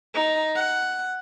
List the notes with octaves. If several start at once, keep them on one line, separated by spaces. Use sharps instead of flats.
D#4
F#5